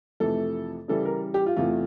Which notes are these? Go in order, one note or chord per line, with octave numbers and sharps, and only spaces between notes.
F2 C3 E3 A3 A4
C#3 E3 G3 A4
A#4
G4
F4
E2 C3 E3 A3 F4